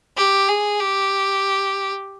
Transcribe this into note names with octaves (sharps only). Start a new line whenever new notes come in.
G4
G#4
G4